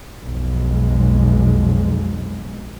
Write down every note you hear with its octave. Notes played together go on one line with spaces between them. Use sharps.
B1 F2 G#3